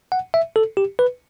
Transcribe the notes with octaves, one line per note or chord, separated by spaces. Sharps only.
F#5
E5
A4
G4
B4